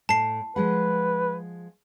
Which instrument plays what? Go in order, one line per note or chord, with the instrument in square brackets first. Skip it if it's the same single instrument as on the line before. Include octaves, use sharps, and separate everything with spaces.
[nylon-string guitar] A2 [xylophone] A5 C7
[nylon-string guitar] F3 G#3 F#5 [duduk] B4